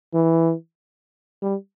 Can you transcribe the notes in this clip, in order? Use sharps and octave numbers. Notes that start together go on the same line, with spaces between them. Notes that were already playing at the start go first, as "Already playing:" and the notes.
E3
G3